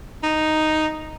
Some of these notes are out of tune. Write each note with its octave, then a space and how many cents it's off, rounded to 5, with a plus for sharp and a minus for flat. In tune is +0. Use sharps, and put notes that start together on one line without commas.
D#4 +0